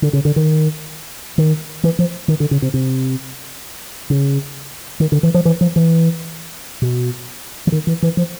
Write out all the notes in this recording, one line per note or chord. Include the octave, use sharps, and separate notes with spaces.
D3
C#3
D3
D#3
D#3
E3
F3
D#3
D3
C#3
C3
C3
C#3
D#3
D3
E3
F3
E3
F3
E3
B2
E3
D#3
E3
E3
F3